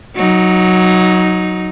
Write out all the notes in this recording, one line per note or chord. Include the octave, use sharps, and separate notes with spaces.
F#3 D#4